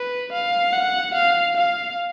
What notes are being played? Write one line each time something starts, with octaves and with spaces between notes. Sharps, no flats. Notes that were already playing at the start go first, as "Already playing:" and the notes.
Already playing: B4
F5
F#5
F5
F5